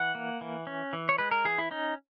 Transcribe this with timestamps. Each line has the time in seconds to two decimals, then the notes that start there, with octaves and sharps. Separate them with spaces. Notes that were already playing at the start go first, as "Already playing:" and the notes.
Already playing: E3 F#5
0.15 A#3
0.41 E3
0.67 C#4
0.93 E3
1.09 C#5
1.18 G#3 B4
1.31 A#4
1.45 E3 G#4
1.58 E4
1.71 C#4 D#4